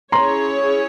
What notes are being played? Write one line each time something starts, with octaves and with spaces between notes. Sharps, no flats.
C#4 E4 G#4 C#5 A#5 C6